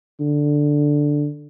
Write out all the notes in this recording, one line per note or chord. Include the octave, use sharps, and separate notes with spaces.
D3